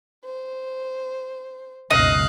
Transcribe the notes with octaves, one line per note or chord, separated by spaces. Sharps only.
C5
F#1 C#2 B2 D#4 D#5 F5 F#6